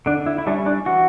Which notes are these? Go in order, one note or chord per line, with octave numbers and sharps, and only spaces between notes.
D3 D4
E4
E4
G3 C#4 D4
D4
E3 F#4